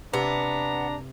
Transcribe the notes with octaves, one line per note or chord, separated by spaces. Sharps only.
C3 B3 D4 A#5